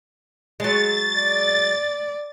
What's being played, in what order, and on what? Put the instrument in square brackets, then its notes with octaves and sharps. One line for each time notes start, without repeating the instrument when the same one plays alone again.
[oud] F#3 G#3 [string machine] A6
[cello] D5